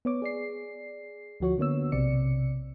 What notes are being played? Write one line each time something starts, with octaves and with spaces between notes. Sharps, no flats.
B3 C#5 D6
G#4 D5 C7
D2 F3 F#4 C#5 C#6
D3 A#3 B3 C#5 E6
B1 C3 C4 D5 C#7